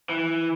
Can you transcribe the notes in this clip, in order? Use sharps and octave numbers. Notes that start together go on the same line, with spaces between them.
E3